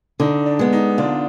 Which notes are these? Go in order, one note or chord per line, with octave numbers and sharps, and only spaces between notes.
D3 D#4
D4
G#3 B3
D#4
D3 D4 F4